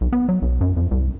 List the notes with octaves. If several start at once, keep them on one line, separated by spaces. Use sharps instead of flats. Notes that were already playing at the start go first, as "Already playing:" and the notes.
B1
B3
F#3
B1
F#2
F2
C2